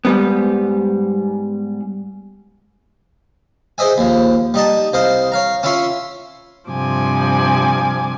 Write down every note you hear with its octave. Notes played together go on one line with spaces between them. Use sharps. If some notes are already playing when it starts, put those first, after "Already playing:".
G#2 G3 B3
G#4 C5 D#5 E5 G#5
D#2 F3
G3 D#4 D#5 A5
C2 C5 D#5 F5
C#5 F5 A#5
C#4 E4 F4 E5 C6 C#6
G2 C3 F3 G#5 D6